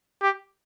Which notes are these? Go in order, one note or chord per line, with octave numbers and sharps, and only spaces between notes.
G4